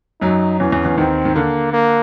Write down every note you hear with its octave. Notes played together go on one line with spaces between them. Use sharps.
F#2 F#3 D#4
E2 E3 C#4
E2 E3
E2 E3
D#2 D#3 C4
D#3
D3 A#3
A#3